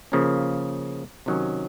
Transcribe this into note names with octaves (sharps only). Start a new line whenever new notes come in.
C#3 F3 A#3 C#4
C3 D#3 F#3 C#4